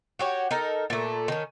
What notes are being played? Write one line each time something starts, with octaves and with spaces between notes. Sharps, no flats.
F#4 G4 C#5
D#4 A4 A#4
A#2 A3
D#3 C#4